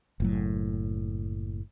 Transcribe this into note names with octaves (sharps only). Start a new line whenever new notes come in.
F#1 A2 F#3